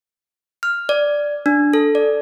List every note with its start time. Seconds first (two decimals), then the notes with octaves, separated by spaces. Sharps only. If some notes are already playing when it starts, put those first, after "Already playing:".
0.63 F6
0.89 D5
1.46 D4
1.73 A4
1.95 D5